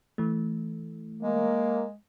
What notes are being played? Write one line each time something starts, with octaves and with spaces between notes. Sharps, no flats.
E3 A3
G#3 A#3